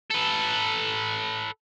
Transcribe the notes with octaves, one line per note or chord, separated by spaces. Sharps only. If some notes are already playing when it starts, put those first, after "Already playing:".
A4 B4